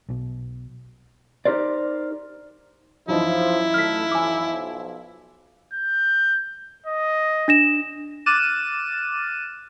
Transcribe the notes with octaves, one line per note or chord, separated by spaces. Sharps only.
B1 B2
D#4 G4 A#4 C5 D5
F#2 E3 F3 D#4 E4
A3 F6 B6
B1 F3 G#5 D6
G6
D#5
D4 A#6 E7
D6 F6 F#6 A6 D#7 E7